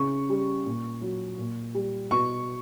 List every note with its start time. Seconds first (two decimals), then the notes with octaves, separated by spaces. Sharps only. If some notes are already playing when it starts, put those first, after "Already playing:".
Already playing: C#3 C#6
0.30 G3
0.66 A#2
1.01 F#3
1.38 A#2
1.75 G3
2.11 B2 C#6